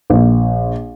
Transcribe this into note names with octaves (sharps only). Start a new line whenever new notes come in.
A#1